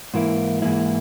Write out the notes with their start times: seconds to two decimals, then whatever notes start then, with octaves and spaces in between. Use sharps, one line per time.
0.14 G#2 E3 A#3 E4
0.62 G#2 E3 A#3 E4